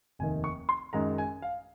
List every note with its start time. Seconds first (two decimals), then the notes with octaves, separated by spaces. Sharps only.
0.19 F1 D#2 D#3 G#5
0.44 C#6
0.69 C6
0.93 F#2 D#3 G#3 A#5
1.18 G#5
1.42 F5